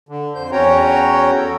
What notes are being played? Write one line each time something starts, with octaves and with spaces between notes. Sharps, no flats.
D3
F2 C5 G6
E2 C#4 F#4 C#5 G5 A#5
A4